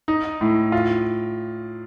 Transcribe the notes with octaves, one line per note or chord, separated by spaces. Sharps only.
D#4
A2
F4